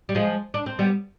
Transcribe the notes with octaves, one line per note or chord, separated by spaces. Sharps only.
G3
F3 G#3
D4
C4
G3 B3